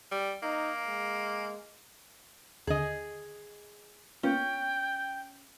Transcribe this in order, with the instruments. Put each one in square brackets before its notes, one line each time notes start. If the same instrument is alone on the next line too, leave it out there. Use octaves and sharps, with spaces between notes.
[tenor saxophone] G3
[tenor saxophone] A#3 [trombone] D#4
[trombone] G#3
[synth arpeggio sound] D#2 D3 [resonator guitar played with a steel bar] G#4 D#5
[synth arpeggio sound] A#3 B3 F4 [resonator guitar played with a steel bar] C#4 [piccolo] G5